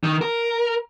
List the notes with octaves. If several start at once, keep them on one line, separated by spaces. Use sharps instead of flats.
D#3
A#4